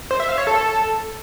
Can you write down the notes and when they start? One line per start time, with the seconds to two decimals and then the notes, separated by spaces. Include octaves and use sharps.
0.11 C5
0.20 E5
0.29 F5
0.38 C#5
0.47 A4